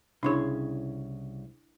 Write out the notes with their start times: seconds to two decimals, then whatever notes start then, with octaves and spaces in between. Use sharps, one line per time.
0.23 C2 C#3 D4 E4 G#4 C#5